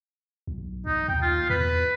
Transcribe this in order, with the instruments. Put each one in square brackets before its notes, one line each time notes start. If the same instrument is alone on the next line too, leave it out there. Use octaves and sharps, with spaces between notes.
[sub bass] B1
[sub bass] B1 [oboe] D#4
[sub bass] D#2 [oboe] G5
[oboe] F4
[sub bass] E2 [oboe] B4